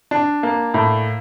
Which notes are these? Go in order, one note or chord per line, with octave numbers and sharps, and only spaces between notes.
D4
A#3
A2